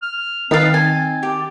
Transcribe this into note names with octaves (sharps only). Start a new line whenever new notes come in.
F6
D#3 C4 D#4 B4 F5 A6
G#5
G4